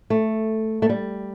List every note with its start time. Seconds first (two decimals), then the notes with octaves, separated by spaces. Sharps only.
0.10 A3
0.82 A3
0.89 G3